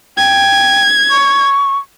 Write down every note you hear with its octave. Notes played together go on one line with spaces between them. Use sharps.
G5 G#6
C#6